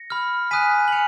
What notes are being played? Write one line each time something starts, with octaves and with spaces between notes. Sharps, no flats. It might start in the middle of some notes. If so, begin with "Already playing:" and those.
Already playing: A#6 C#7
B5 F6
G#5 D#6 F#6 B6 D#7
F#7
G#5 C#7 F7